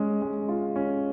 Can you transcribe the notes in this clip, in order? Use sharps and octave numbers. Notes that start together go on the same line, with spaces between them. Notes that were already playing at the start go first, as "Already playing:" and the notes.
Already playing: G#3 C#4
G#3
F4
C#4